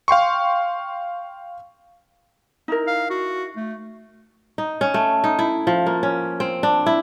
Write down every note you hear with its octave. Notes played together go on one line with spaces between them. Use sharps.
F5 G5 C6 C#6
D#4 E4 A#4
F5
F#4
A3
D#4
C#4
A3
D#4
E4
F3
A#3
C#4
C4
D4
E4